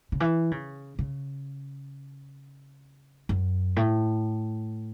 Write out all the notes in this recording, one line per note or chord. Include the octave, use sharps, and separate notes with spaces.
C#3
E3
C#3
C#3
F#2
A2